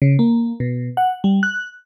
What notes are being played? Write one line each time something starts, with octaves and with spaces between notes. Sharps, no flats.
C#3
A#3
B2
F#5
G3
F#6